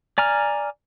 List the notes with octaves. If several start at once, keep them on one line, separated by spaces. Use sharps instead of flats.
D5 G#5 A#5 F6